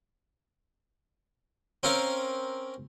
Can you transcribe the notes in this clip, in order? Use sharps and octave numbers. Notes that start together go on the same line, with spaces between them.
C4 C#4 A#4 F5